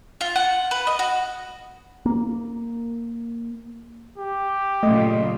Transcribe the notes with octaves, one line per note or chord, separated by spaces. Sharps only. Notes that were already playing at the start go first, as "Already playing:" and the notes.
F4
F#5
B4
D#5
F#4
A#3
G4
A#2 C#3 F#3 A3 D#5